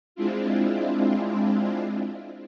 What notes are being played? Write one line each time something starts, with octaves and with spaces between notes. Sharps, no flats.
G#3 C4 D4 E4 F4